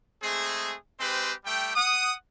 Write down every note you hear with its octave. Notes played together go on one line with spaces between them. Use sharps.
G#3 A3 C4 G#4
G#3 C4 G4 B4 C5
G3 A3 G5
F#5 D#6